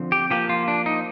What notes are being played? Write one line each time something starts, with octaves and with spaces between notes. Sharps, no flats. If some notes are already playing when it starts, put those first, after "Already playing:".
Already playing: D3 F3 C4
G4
F3 A#3 G4
F4
D4
D#4